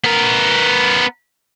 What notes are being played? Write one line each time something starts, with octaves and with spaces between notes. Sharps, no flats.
B3 A#4